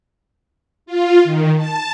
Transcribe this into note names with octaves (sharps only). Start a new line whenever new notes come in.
F4
D#3
A5